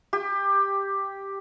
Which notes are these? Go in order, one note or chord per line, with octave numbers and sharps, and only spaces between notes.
G4